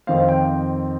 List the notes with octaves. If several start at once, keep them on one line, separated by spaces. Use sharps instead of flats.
F2 D#3 C4 F5
G5